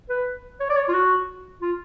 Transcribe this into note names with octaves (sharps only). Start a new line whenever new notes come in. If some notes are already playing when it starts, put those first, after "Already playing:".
B4
C#5
D5
C#5
F4
F#4
F4